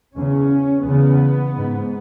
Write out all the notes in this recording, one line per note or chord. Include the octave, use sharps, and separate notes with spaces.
E2 C#3 C#4
E2 C#3 B3
G#2